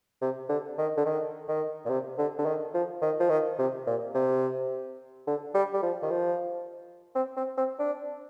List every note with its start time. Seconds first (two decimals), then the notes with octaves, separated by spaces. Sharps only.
0.21 C3
0.49 D3
0.78 D#3
0.97 D3
1.06 D#3
1.48 D#3
1.85 A#2
1.90 C3
2.18 D3
2.39 D3
2.46 D#3
2.74 F3
3.02 D#3
3.20 F3
3.30 D#3
3.59 C3
3.87 A#2
4.14 C3
5.27 D3
5.55 G3
5.74 G3
5.83 F3
6.02 D#3
6.11 F3
7.16 C4
7.37 C4
7.58 C4
7.79 D4